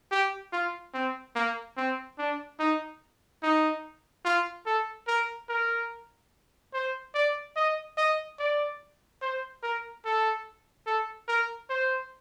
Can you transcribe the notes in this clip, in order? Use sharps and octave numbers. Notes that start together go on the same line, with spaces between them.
G4
F4
C4
A#3
C4
D4
D#4
D#4
F4
A4
A#4
A#4
C5
D5
D#5
D#5
D5
C5
A#4
A4
A4
A#4
C5